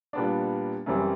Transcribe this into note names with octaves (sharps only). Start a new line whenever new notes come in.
A#2 G3 B3 D4
F#2 C#3 E3 G3 C4